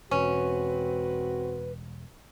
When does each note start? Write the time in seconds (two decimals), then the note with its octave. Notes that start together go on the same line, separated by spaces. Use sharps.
0.11 E1 C4 C#4 F#4 B4